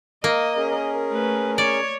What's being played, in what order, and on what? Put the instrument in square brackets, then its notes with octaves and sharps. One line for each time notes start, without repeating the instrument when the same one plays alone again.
[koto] A#3 [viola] D#5
[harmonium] C#4 G#4 A#4
[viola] A3 B4
[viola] C#5 [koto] D5